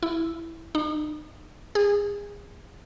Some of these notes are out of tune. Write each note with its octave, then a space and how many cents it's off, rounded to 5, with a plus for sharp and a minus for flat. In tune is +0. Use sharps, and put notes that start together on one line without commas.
E4 +0
D#4 -40
G#4 -30